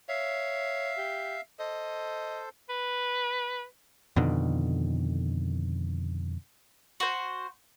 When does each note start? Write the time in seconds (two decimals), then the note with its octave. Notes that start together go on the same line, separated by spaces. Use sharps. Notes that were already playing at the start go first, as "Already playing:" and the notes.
0.09 C#5 E5 F5
0.98 G4
1.59 A4 C5 D#5
2.69 B4
4.16 F2 B2 D3 D#3
7.00 F#4 C5